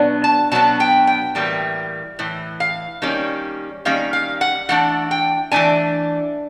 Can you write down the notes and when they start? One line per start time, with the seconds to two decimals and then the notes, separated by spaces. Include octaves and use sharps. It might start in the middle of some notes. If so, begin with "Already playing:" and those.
Already playing: B2 F#3 B3 D4
0.24 A5
0.52 B2 F#3 B3 D4 A5
0.80 G5
1.07 G5
1.35 A2 E3 G3 A#3
2.19 A2 E3
2.60 F5
3.02 D#3 G3 A#3 C#4
3.85 D#3 G3 A#3 C#4 F5
4.13 F5
4.41 F#5
4.69 E3 A3 D4 F#5
5.11 G5
5.52 E3 A3 D4 G#5